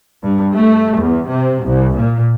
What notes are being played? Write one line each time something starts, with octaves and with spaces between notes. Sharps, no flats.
G2
A3
E2
C3
C2
A#2